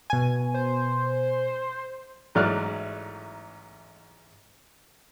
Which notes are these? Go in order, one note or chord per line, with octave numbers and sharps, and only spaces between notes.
B2 G#5
C5
A1 G#2 F#3 D5 F6 F#6